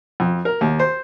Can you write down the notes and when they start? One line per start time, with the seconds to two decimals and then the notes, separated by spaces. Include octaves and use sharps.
0.20 F2
0.45 A#4
0.61 D#2
0.79 C5